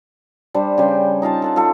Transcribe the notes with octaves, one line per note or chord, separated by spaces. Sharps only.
G3 D4 C5
C#3 G3 G5 C6
D#4 F4 F5 A5
A4 F#5 A5
F4 G#4 A4